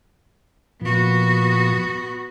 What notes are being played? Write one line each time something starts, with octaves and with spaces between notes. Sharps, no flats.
A#2 F3 B3 F#4